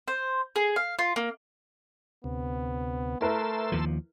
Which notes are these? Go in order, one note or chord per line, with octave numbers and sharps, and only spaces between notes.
C5
G#4
F5
F4
A#3
D2 C3 B3
A3 E4 A#4 B4 A5 C6 E6
D#2 F3